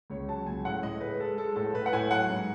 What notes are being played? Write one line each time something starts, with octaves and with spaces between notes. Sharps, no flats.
C#2 C#5
F#3 A5
C#2 G#5
A2 F#5
A2 D#5
G#3 B4
G#3 A4
G#3 A4
A2 A4
A2 B4
F#5
A2 G#5
F#3 F#5
G#2